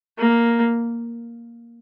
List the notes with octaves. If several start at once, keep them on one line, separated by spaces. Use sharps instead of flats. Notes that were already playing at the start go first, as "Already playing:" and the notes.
A#3